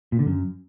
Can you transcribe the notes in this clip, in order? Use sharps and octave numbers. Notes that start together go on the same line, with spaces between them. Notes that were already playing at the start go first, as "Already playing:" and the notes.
A#2
D3
F#2